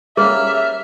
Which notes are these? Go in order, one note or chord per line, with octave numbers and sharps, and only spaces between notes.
G3 A#3 C#4 G#4 C5 E5 F6